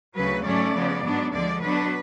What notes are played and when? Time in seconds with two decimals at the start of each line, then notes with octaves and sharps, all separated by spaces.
0.15 D2 C#3 F#3 B4
0.45 G#2 F#3 A3 C#4 D5
0.74 C#3 F3 B3
1.04 G#2 F#3 B3 D4
1.32 D2 D3 F3 G#3 D5
1.61 B2 F#3 B3 D4 B4